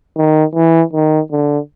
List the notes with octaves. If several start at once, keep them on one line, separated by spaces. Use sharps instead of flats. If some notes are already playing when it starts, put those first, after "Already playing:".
D#3
E3
D#3
D3